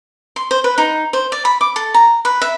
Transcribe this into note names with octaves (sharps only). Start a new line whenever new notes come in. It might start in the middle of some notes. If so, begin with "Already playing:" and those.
C6
C5
B4
D#4
C5
D5
B5
D6
A4
A#5
B4
E5